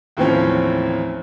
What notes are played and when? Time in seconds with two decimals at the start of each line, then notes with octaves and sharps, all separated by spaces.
0.17 D#2 A2 E3 F3 C4 C#4